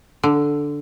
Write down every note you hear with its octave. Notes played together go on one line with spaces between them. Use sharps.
D3